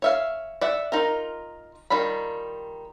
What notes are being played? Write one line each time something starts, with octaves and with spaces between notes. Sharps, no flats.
C#5 E5 F5
D5 E5 F#5
D#4 F4 A#4
D#3 G3 F4 B5